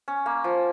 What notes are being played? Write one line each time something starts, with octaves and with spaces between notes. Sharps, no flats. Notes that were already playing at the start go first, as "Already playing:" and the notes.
C#4
A#3
F3